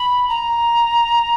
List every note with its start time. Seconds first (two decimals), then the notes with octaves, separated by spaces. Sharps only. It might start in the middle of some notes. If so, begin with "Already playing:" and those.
Already playing: B5
0.29 A#5